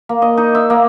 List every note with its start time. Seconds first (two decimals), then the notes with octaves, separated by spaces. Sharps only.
0.09 A#3
0.22 D#5
0.37 D#4
0.55 E5
0.70 A#3